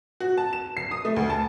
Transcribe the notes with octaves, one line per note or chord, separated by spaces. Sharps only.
F#4
A5
E7
C7
D#6
A3
D2
A5